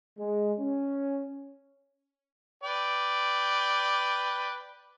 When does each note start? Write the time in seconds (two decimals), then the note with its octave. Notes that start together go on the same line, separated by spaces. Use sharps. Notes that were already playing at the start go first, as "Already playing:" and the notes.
0.17 G#3
0.60 C#4
2.63 B4 D5 G5